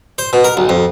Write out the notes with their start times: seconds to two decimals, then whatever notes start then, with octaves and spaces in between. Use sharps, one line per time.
0.18 C5
0.33 B2
0.44 A#4
0.57 B1
0.69 F2